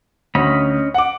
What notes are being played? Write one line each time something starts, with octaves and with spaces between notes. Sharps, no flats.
D2 C#4 D#5 B5
F#5 D6